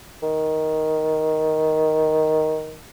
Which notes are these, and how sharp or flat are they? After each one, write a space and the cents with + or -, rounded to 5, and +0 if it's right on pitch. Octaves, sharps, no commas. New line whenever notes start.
D#3 +5